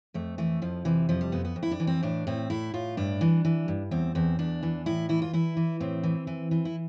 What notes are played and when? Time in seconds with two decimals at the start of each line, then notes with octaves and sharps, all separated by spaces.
0.14 F2 A3
0.38 E3 A3
0.62 F2 F3
0.85 C3 E3
1.09 F2 F3
1.21 G3
1.32 F2 B3
1.45 B3
1.56 F2
1.63 E4
1.71 D4
1.80 E3
1.87 C4
2.03 A2 D4
2.27 A2 C4
2.50 A2 E4
2.74 A2 F4
2.97 G2 D4
3.21 E3
3.45 E3
3.68 G2
3.91 E2 C4
4.15 E2 C4
4.39 E2 D4
4.63 E3
4.86 A2 E4
5.09 E3 E4
5.22 F4
5.33 E3 E4
5.57 E3
5.80 A2 C4
6.04 E3
6.27 E3
6.51 E3
6.65 E4